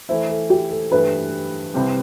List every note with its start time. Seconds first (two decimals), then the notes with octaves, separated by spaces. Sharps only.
0.09 E3 A3 E4 C5
0.30 A4
0.50 G4
0.71 A4
0.92 G2 E3 A3 B4
1.74 C2 C3 G3 C4 G4